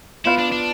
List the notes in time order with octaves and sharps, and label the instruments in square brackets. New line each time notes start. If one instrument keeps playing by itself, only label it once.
[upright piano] B3 F4 B4 F5 [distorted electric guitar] E4
[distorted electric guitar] D4
D4